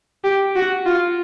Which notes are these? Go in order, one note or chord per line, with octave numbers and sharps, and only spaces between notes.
G4
F#4
F4